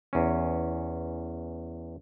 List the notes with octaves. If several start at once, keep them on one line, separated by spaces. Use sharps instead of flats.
E2 C#4